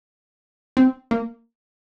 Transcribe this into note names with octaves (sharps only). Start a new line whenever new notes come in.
C4
A#3